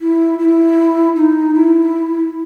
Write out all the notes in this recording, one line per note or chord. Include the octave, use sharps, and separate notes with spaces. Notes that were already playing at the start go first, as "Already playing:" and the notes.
E4
E4
D#4
E4